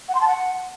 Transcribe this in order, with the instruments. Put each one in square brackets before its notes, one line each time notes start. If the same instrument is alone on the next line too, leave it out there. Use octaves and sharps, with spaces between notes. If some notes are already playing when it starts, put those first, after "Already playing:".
[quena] F#5
C6
A5
F#5